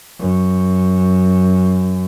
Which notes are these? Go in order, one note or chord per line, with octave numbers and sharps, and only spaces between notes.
F#2